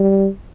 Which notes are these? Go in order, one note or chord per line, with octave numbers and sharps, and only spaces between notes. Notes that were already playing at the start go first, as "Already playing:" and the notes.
Already playing: G3